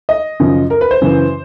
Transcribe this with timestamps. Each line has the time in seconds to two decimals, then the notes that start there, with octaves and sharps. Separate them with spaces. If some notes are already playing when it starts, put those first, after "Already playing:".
0.09 D#5
0.40 F#2 C#3 F3
0.70 A#4
0.81 B4
0.91 C5
1.01 F#2 C#3 E3